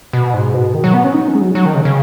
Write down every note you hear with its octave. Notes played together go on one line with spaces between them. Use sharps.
B2
G#2
B2
D#3
F#3
B3
C#4
D#4
C#4
G#3
F#3
F#3
D#3
C#3
C#3